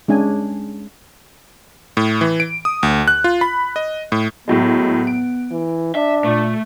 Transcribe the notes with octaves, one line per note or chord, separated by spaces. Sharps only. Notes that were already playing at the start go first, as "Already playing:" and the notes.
G#3 C#4 D4 G#5
A2
E3
D7
D#6
D2
F#6
F4
B5
D#5
A2
A2 F#3 G#3 B3
D7
E3
D4 E5
A#2 A3